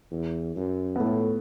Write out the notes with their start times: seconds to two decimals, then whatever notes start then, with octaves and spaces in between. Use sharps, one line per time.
0.11 E2
0.56 F#2
0.96 B3
1.00 A2 A3